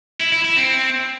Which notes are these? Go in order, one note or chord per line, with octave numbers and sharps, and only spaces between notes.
E4
E4
E4
C4